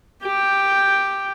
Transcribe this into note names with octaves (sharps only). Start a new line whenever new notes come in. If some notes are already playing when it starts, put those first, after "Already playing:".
G4 G5